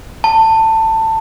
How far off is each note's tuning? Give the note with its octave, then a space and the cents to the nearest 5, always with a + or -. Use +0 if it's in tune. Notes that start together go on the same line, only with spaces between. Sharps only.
A5 +20